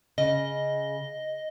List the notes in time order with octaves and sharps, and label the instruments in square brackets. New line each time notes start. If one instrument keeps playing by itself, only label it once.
[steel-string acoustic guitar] C#3 [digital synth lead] D#5